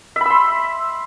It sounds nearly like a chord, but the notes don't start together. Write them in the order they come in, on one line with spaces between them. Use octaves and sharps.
E5 B5 E6 C6